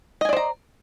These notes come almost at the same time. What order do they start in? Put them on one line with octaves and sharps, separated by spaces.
D#5 G#5 D5 C5 A#5